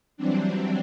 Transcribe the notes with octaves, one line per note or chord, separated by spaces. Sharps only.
E3 F#3 G3 C4 D4